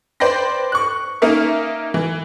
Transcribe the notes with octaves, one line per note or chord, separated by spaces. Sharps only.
B4 C5 D5 G5 C6 A#6
C#6 F#6
A#3 C#4 D#4 A#4 E5
E3